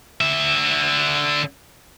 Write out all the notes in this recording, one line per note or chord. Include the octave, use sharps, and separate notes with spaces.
D3 E5